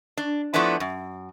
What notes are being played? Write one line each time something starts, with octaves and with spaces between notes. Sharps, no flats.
D4
F3 A3 B3 D4 E4
F#2